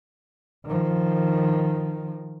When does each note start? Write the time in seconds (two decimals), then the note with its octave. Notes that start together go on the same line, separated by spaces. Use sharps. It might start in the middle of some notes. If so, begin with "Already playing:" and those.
0.65 D#3 F3